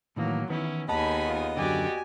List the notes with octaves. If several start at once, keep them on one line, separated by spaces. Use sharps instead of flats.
A2 D#3 E3 F#3 A#3
D#3 E3 B3 C#4 E4
D#2 D#3 B3 G#4 D#5 G#5 A5 B5
F4
F#2 D3 F#4 G4 D5 G#5